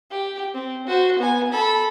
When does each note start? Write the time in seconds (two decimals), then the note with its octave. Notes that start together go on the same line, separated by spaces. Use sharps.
0.11 G4
0.54 C4
0.87 F#4 C5
1.19 B3 G#5
1.52 A4 B5